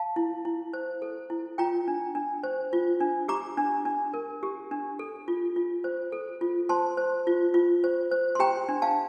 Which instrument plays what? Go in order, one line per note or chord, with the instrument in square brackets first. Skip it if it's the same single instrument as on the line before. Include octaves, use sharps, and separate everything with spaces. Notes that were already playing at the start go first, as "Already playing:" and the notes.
Already playing: [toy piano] F5 A5
E4
E4
C5
A4
E4
F4 G5 A#5
D4
D4
C5
F4
D4
G4 A#5 D6
D4
D4
A#4
G4
D4
A4
F4
F4
C5
A4
F4
C5 A5 C6
C5
F4
F4
C5
C5
C6
G4 G5 A#5
D4
F5 A5